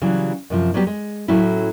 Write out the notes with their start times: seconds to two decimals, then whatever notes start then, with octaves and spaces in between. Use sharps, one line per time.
0.01 C#3 E3 F#3 G3
0.50 F#2 C3 F3
0.74 F#3 G3 B3 G4
0.87 G#3
1.28 A2 F#3 A3 C#4 E4